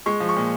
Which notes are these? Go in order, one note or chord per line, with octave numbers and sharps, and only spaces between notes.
G#3 C#6
F3
C#6
A#2